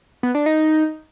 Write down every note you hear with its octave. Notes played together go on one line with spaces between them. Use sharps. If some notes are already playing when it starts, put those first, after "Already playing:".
B3
D4
D#4